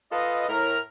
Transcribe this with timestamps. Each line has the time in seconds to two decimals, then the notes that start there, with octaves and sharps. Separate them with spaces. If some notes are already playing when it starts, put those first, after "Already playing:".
0.11 F4 A4 B4 D#5
0.49 A2 A#4 F6